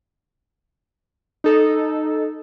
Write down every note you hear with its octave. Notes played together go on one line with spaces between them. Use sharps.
D#4 A4